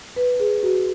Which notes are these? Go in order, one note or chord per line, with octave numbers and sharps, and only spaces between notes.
B4
G#4
F#4